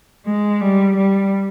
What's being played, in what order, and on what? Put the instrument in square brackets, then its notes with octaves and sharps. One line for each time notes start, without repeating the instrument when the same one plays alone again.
[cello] G#3
G3
G3